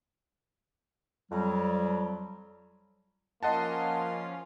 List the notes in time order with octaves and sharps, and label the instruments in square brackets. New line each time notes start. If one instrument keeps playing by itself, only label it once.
[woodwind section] F2 F#3 G3
[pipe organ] F3 C#4 F4 [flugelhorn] A#3 [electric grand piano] D#5 F#5 A5 [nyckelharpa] C6